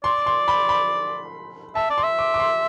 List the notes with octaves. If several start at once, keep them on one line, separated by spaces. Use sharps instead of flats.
D5 C6
C6
B5
B5
E5 A5
D5
C6
E5
D6
D6
C6